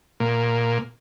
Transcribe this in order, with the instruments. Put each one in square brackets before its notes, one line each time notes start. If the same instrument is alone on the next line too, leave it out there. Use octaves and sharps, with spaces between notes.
[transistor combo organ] A#2